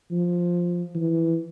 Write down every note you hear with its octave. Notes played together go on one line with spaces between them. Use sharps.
F3
E3